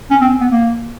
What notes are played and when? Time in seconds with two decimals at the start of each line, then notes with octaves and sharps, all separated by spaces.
0.11 C#4
0.21 C4
0.41 B3
0.51 A#3